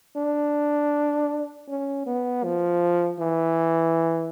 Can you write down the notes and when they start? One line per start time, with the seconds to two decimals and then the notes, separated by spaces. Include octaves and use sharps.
0.16 D4
1.68 C#4
2.06 B3
2.44 F3
3.20 E3